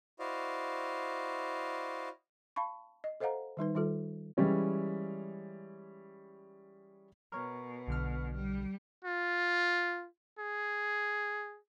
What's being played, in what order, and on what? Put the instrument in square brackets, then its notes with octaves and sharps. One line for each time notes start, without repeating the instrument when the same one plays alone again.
[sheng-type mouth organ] E4 F#4 C5 D5 D#5 F5
[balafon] F5 A5 B5 C#6
D#5
A4 C5 D#5 F5 F#5 A#5
D#3 G3 D#4 B4
D#3 G3 F4 A4
[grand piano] E3 G3 G#3 C#4 E4
[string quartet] B2 [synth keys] A#4 C#5
[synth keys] B1 D3 F6
[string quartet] G3
[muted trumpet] F4
G#4